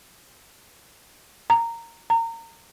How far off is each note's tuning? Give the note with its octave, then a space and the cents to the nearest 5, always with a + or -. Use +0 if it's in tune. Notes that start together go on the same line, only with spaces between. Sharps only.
A#5 -15
A#5 -30